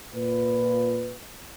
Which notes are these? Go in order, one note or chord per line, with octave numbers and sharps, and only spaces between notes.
A#2 F4 B4